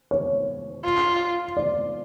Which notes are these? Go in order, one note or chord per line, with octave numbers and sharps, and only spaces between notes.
C#5
F4
D5